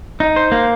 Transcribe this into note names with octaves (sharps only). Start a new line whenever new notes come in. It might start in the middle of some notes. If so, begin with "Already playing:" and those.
D#4
C5
A#3